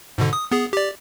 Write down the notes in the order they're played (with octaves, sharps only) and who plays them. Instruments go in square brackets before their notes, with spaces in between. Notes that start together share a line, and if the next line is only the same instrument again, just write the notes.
[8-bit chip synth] G#2 B2 D3
D#6
B3 G#4
G4 D5